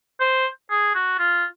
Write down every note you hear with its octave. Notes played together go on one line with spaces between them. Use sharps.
C5
G#4
F#4
F4